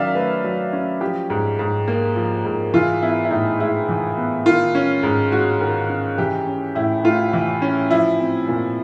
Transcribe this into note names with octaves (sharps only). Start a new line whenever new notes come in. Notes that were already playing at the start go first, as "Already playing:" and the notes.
Already playing: D#3 F#3 C#4 D5 E5 F5
A3 B4
F#3
C#4
F3 G4
G#2
G#2
A#3
F3
G#2
E3 F4
B3 E4
E4
A2 D#4
G#3 E4
E3
B3
D#3 F4
C#4
G#2
G#3 F#4
D#3
C#4
E3 G4
C#4
A2 E4
A3 F4
E3
C#4
F3 E4
C4
A#2